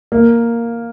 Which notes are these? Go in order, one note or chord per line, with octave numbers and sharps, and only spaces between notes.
A#3